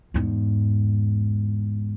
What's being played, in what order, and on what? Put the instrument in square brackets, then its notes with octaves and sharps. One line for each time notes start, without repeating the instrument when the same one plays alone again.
[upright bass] E2 G#2